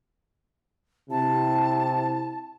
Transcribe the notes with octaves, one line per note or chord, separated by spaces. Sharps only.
C3 E4 A5